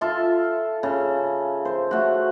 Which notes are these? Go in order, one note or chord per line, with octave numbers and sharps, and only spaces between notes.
F4 A4 E5
C#3
C5
A3 F#4